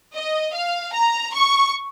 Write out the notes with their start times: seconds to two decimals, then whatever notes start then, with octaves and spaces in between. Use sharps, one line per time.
0.14 D#5
0.54 F5
0.94 A#5
1.34 C#6